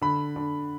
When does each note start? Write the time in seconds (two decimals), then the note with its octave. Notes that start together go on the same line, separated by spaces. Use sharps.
0.02 D3 B5
0.36 D3